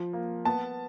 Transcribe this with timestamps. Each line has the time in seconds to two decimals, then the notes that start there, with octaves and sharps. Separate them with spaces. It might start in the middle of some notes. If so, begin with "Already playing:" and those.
Already playing: F3
0.13 A#3
0.45 B3 A5